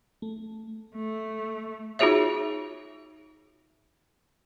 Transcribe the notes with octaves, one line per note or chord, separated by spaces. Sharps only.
A3
A3
D#4 F4 F#4 G#4 C#5 E5